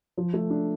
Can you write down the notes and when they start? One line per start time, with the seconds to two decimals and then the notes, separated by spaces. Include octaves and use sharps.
0.17 F3
0.33 A3
0.50 D4